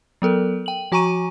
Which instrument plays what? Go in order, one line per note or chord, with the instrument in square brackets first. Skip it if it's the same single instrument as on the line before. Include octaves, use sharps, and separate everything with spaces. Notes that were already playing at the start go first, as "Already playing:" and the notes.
[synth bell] F#3 B3 A4 A#4
G5 F#7
F3 F#4 G#5 A#5 C#6 D#7